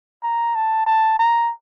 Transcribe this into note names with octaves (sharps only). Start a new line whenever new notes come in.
A#5
A5
A5
A#5